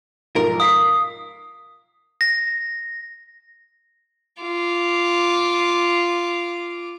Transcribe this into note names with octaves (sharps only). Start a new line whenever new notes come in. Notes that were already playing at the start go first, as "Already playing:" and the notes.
B1 G#2 F3 A#4
F5 D#6 B6 C7
A#6
F4 D6